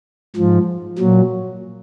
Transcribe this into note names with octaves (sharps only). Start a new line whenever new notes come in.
G#2 F3
A#2 F#3